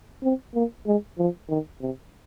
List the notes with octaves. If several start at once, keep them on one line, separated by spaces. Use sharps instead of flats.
C4
A#3
G#3
F3
D#3
C3